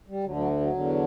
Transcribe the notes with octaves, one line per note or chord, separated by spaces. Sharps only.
G3
D2 D3 F#3
F#3
F#3
E2 D3